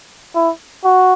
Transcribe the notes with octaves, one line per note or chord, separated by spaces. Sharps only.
E4
F#4